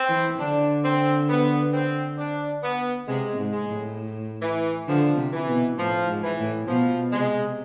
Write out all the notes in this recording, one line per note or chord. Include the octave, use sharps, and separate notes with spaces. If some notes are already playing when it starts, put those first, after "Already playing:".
Already playing: C4
E3
D3 D4
C4
B3
C4
D4
B3
C3 G#3
G#2
G#3
A2
E3
D3 F3
C3
E3
B2
A2 F3
G#2
E3
A2
B2 F3
C3 G#3